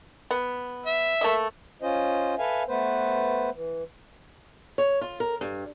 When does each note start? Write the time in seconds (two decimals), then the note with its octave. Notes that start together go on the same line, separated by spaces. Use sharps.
0.31 B3
0.86 E5
1.21 A3 A#3 D#5
1.82 C#4 F4 C5 D#5
2.39 A4 B4 E5 F5 G#5
2.68 A3 B3 B4 C5
3.54 E3
4.78 C#5
5.01 F4
5.20 A#4
5.41 G2